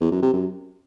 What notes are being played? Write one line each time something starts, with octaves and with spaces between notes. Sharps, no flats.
E2
F#2
C3
F#2